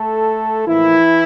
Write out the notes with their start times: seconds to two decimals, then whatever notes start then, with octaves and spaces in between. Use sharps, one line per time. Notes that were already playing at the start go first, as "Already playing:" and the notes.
Already playing: A3 A4
0.66 A2 E3 F3 A#3 E4